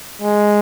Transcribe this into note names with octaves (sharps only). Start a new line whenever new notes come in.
G#3